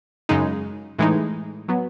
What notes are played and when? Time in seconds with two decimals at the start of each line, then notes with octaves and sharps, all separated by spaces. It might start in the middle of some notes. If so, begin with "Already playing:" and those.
0.29 F#2 C#3 G#3 D#4
0.99 A2 E3 G#3 D#4
1.68 F#3 B3